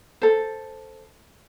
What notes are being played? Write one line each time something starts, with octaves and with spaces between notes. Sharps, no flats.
A4 C5